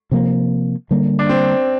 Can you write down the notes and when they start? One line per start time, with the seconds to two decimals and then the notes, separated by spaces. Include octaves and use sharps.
0.11 C3 F3 A#3
0.91 D3 G3 A#3
1.19 D4
1.29 C4